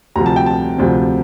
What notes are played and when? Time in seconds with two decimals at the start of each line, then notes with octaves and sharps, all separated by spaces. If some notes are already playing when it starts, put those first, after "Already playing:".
0.16 D2 C3 F3 A#5
0.26 A5
0.36 G5
0.46 A5
0.78 D2 C3 F3